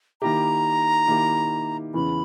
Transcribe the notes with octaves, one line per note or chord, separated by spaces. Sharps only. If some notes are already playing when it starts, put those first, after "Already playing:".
D#3 A#3 E4 G4 A#5
D#3 A#3 E4 G4
E2 C#3 E3 B5